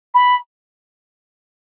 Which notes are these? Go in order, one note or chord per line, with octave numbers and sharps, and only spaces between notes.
B5